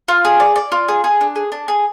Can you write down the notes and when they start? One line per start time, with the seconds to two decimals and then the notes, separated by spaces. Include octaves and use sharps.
0.08 F4
0.25 G#4
0.40 D5
0.56 D5
0.72 F4
0.88 G#4
1.04 G#4
1.21 D4
1.36 G#4
1.52 D4
1.68 G#4